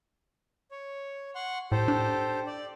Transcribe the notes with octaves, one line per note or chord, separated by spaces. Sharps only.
C#5
F#5 C6 C#6
A2 G4 A4 C5
D4
D5